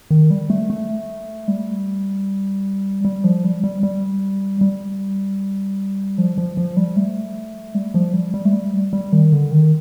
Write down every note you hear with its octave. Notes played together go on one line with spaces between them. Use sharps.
D#3
G3
A3
A3
G3
G3
F3
G3
G3
G3
G3
F3
F3
F3
G3
A3
G3
F3
G3
G3
A3
G3
G3
D#3
D3
D#3